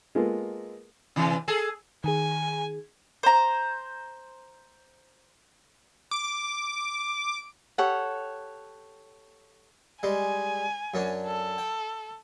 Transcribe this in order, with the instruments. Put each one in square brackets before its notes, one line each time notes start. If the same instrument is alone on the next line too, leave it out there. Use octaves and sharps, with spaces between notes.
[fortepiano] G#3 A#3 B3 F4 A4 A#4
[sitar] C3 E3
G#4 A4
[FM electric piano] D#3 G#4 [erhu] G#5
[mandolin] C5 A#5
[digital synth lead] D6
[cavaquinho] G4 A4 C#5 F#5
[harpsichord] G3 G#3 [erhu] G#5
[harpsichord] F#2 C#4 D4
[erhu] A4
[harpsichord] G5